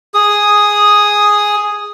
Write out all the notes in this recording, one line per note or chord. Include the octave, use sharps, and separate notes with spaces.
G#4 D#6